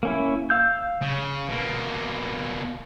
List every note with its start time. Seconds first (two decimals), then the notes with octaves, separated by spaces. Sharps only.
0.03 A#3 C#4 E4
0.50 F5 E6 G6
1.02 C#3
1.49 B2 A#3